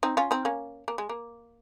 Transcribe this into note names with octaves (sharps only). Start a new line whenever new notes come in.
C4 D#4
C#4 F4
C4 D#4
A#3 C#4
A#3
G#3
A#3